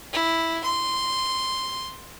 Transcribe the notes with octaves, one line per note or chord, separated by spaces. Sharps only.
E4
C6